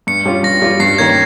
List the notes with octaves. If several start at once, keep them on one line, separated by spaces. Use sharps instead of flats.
G2 C#7
G3 C#4 F4
G2 A#6
G3 C#4 F4
G2 C7
D#3 A#3 C#4 G#6